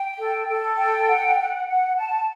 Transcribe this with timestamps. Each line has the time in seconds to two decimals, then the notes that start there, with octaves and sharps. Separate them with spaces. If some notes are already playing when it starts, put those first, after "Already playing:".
Already playing: G5
0.18 A4
0.48 A4
0.78 G5
1.07 F#5
1.37 F#5
1.67 F#5
1.97 A5